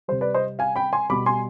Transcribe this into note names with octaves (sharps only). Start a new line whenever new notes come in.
C3 G3 C5
B4 D5
C5 D#5
F5 G#5
G5 B5
G#5 C6
B2 G3 B5 D6
G#5 C6